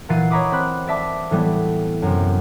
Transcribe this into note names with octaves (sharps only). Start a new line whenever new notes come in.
A#2 E3 F#5 A6 C7 D#7
C#5 D#5 A#5 B5 D6 D#6
C4 C5 B5 F#6
D5 E5 A5 D6
A2 E3 G3 B3
F#2 C3